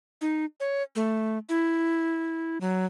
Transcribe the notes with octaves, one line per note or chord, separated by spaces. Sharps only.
D#4
C#5
A3
E4
F#3